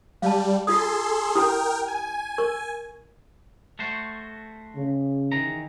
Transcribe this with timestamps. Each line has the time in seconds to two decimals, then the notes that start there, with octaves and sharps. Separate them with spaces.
0.22 G3 F5 A5
0.67 F4 G#4 A4 C6 D#6
1.35 E4 G4 A#4 G5 D#6
1.88 G#5
2.38 A#4 C#6
3.79 A3 F#4 C5
4.76 C#3
5.32 D#3 E3 A#5